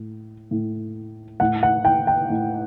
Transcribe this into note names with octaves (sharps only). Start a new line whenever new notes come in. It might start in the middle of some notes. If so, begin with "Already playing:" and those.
Already playing: A2
A2
A2 F#5
F#5
G5
G5
A2